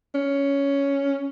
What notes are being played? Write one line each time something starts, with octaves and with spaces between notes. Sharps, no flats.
C#4